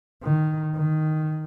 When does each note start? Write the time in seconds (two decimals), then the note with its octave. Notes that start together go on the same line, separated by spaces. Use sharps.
0.23 D#3
0.76 D#3